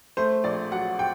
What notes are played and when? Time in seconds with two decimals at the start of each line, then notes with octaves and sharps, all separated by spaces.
0.17 A3 C5
0.44 A#1 D5
0.72 F#3 F#5
0.99 G5